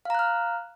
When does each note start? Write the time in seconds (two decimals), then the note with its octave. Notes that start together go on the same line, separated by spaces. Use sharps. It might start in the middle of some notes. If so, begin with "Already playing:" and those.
0.05 F5
0.10 A#5
0.15 F#6
0.19 F6